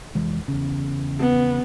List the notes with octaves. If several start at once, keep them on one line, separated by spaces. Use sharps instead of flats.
F1 E3 G#3
E2 C#3
B3